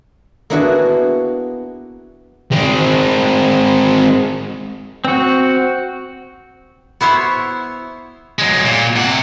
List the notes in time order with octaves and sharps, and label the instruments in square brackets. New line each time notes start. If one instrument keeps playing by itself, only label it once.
[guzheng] A#3 B3 D4 E4 F#4 G#4
[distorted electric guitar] G#3 C4
[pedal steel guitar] C4 F#4
[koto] B3 E4 C5 C#5
[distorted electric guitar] F#3 G#3
A#2
C3 F#5